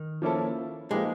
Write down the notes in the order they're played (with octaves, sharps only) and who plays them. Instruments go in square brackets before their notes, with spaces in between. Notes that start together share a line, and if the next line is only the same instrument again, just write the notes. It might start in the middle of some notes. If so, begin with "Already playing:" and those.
Already playing: [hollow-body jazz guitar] D#3
[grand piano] F3 A#3 C#4 E4 A4
[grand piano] F3 A#3 D#4 G4 B4 [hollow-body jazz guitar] G#3